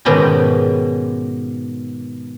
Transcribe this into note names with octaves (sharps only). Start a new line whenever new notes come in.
G#2 B2 D#3 B3 C#4 G4